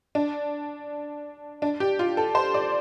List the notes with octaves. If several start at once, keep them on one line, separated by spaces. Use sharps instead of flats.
D4
D4
G4
F4
A4
C5
D5